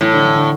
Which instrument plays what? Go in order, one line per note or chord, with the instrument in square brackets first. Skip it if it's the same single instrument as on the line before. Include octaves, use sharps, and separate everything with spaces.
[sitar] A2 [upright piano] E3
[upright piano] D3
E3
D3